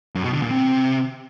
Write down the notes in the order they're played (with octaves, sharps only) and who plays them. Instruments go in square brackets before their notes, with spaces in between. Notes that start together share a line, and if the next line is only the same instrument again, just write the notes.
[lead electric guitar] F#2
B2
D3
A#2
C3